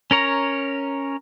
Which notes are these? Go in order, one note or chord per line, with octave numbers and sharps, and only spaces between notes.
C#4 A#4 C#5 A#5